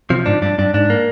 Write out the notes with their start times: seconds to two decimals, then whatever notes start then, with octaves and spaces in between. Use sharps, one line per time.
0.10 C3 F3
0.26 G#2 D4
0.42 G2 D4
0.58 G2 D4
0.74 G#2 D4
0.90 A#3